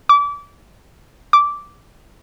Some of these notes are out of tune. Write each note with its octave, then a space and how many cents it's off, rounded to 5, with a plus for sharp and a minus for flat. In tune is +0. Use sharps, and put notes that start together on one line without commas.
D6 -30
D6 -10